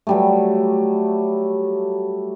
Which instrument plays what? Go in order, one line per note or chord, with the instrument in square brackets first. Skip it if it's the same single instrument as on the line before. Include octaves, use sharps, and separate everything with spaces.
[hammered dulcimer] F#3 G3 A3